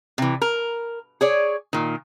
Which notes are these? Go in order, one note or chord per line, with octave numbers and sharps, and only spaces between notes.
C3 E3
A#4
G#4 C#5 D5
A#2 D#3